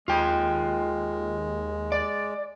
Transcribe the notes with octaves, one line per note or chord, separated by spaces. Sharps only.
D#2 G#3 F4 G5
D5